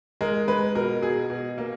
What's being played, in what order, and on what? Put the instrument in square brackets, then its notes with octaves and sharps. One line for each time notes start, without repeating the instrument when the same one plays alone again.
[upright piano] G#3 A#4
G#3 B4
B2 A#4
B2 G#4
B2
A#3